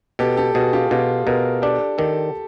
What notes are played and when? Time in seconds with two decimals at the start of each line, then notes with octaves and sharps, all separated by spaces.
0.19 B2 G4 A4
0.37 G4 A4
0.54 B2 F#4 G#4
0.73 F4 G4
0.91 B2 F4 G4
1.26 B2 G#4 A#4
1.62 D4 G4 A4
1.98 D#3 G4 A4